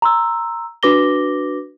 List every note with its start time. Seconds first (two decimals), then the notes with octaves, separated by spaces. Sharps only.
0.02 A#5 C6 E6
0.83 D4 F#4 B4 D6 A#6 G7